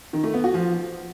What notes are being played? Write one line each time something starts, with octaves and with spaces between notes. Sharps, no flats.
D#3
A3
B3
F#4
F3